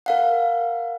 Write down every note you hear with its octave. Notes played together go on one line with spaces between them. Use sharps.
A#4 F5 F#5